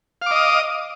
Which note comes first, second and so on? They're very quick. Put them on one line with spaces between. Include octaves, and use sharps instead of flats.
F5 D6 D#5 D#6